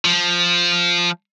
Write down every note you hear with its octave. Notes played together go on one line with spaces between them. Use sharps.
F3